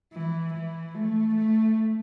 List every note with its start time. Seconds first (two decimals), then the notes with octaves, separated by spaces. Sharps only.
0.13 E3
0.54 E3
0.95 A3
1.35 A3